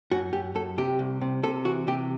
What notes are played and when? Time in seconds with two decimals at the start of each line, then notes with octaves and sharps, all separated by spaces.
0.11 F#2 F#4
0.33 F#2 G4
0.55 F#2 A4
0.78 C3 G4
0.99 C2
1.21 C3
1.43 C3 A4
1.65 E3 F#4
1.88 C3 G4